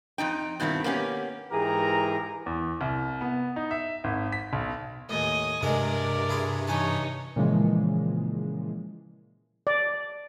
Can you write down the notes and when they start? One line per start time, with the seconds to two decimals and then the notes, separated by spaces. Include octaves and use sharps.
0.18 F2 E3 D#4 G5
0.60 G2 B2 D#3 C4 E4
0.84 A#3 B3 C#4 G4
1.52 G#2 E3 G4 G#4 A#4 A#5
2.46 E2
2.81 C2
3.21 B3
3.56 D#4
3.71 E5
4.04 G#1
4.32 B6
4.53 B1
5.10 D#2 A2 D#5 G#5
5.63 G2 C3 G#3 G#4 A#4 D5
6.29 E4 G#4 C6
6.67 E3 D#4 C#5 G#5 A5
7.36 A#2 C#3 E3 F3 G#3
9.67 D5